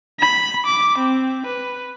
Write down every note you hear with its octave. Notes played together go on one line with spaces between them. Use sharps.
B5
D6
C4
B4